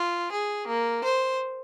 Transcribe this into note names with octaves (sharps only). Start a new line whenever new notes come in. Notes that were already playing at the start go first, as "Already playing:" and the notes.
Already playing: F4
G#4
A#3
C5